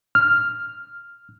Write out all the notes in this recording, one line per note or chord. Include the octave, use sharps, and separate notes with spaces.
F6